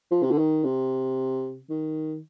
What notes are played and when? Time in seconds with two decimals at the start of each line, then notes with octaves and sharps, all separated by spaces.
0.11 F3
0.23 C3
0.31 D3
0.38 D#3
0.64 C3
1.70 D#3